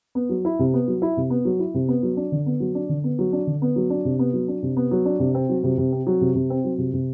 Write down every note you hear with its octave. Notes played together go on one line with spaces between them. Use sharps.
B3
F#3
E4
C3
B3
F#3
E4
C3
B3
F#3
E4
C3
B3
F#3
D4
D3
B3
F#3
D4
D3
B3
F#3
D4
D3
B3
F#3
D4
C3
B3
F#3
D4
C3
B3
F#3
D4
C3
C4
F#3
C3
C3
C4
F#3
C3
C3
C4
F#3
C3
C3